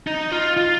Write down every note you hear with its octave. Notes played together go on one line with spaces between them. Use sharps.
D#4
F4
F4